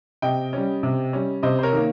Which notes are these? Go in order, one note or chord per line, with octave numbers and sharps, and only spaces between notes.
C3 D#5 G5
G3 C#4
C3
G3 C#4
C3 C5 D#5
C5
A#4 C#5
D#3 A#3